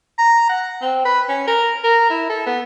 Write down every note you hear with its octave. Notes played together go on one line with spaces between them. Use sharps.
A#5
F#5
C4
B4
C#4
A#4
A#4
E4
A4
B3